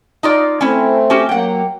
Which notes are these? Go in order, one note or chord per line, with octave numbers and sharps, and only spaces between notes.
D#4 F4 D5
A3 C4 C#4 E4
C#4 F#4 G4
F#3 A#3 F#5 G5